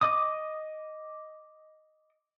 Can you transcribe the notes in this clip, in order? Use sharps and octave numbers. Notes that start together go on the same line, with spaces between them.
D#5 D6 D#6